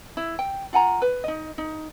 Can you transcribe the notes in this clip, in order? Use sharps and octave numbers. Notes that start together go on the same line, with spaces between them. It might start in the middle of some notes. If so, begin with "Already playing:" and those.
E4
G5
F4 F#5 G#5 A#5
B4
D#4 D#5
D#4